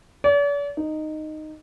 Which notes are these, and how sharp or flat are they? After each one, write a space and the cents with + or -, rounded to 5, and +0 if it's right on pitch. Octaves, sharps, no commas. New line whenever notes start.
D5 -45
D#4 -10